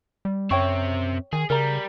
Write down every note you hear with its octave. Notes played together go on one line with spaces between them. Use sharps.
G3
F#2 C4 C#5 E5 G5 C#6
D#3 G#4 G#5
C#3 G3 A#4 A#5